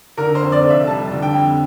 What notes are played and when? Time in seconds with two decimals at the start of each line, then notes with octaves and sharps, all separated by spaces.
0.17 D3 A#4
0.35 C5
0.41 F2
0.52 D5
0.64 F1
0.70 E5
0.87 G3 A5
1.11 D3
1.22 G5
1.34 F2